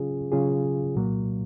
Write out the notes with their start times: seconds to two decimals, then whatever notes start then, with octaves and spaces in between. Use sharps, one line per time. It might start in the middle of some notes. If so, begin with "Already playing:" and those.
Already playing: C#3 F#3 C#4 F4 G#4
0.32 C#3 F#3 C#4 F4 G#4
0.95 C2 A#2 F#3 A#3